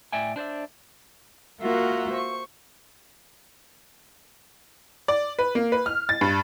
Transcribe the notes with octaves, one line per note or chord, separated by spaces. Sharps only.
A2 D5 E5 G5 G#5
D4 C5 D5 E5
A#3 F4 F#4 A#4 E5 F#5
C5 C#6
D5
B4
A#3
B4
F6
A6
G2